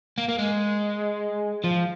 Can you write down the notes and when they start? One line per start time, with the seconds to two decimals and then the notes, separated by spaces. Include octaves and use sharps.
0.18 A#3
0.28 A#3
0.38 G#3
1.64 F3